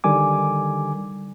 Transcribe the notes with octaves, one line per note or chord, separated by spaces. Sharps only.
D3 D#3 G3 G#5 D6